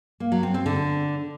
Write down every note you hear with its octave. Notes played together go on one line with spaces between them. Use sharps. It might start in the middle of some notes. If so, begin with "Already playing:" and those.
A#3
F#3
C4
C4
D3